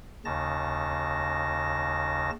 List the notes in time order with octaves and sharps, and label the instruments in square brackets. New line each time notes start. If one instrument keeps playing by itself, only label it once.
[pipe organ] D#2 C#3 A5 A#6